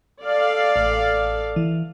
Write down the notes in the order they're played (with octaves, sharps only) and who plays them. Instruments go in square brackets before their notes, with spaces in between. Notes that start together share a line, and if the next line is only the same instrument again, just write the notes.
[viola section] A4 D5 F5
[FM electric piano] A1
E3